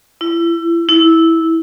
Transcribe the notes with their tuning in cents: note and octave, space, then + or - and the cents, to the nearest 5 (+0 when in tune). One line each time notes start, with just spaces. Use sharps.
E4 +30
E4 -10